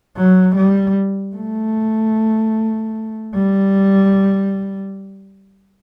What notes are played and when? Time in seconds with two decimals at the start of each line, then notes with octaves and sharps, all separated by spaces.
0.17 F#3
0.56 G3
1.36 A3
3.35 G3